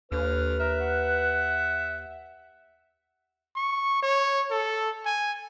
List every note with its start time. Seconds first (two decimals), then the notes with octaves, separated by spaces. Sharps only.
0.12 D#2 D3 B4 F6
0.60 A#4 E5
0.81 F#5
3.56 C#6
4.03 C#5
4.51 A4
5.06 G#5